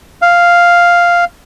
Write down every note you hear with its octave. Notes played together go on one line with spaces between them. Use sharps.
F5